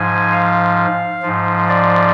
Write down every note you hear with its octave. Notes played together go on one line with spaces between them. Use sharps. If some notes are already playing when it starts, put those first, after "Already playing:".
Already playing: G#2 F3 G#5
F5
G#2 F3
D5